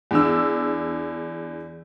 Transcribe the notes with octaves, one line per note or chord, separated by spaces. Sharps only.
E2 D4 E6